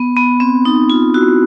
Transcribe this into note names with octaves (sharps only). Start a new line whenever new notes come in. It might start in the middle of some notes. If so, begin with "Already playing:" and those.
Already playing: B3
B3
C4
D#4
F4
E4 F#4